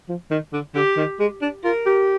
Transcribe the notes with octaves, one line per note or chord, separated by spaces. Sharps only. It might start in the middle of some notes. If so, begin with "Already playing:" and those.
F3
D#3
D3
D3 G4
D#3
G#3
D4
F4 A#4
G4